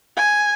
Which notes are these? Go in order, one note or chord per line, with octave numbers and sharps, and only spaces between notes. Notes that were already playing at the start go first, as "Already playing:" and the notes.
G#5